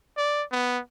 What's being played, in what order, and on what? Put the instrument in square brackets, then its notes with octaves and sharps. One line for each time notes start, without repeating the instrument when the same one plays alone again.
[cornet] D5
B3